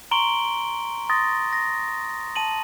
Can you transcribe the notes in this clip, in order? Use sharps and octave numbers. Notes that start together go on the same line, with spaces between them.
A#5 C6 C#6 D7 F#7 G7
C6 D#6 A6 A#6
A#6
A5 D#7 F#7